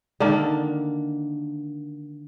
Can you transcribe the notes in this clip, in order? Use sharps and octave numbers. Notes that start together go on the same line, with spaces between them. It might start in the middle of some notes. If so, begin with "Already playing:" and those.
D3 D#3 A#3 D4